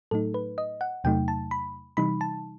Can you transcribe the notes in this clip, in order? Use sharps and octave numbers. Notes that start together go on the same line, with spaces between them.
A2 F#3 A3 D#4 A4
B4
D#5
F#5
E2 C3 F#3 A3 D#4 G5
A5
B5
C3 E3 G3 D#4 B5
A5